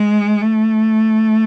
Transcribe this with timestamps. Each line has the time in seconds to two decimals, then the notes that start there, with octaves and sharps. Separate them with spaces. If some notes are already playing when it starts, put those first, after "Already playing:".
Already playing: G#3
0.42 A3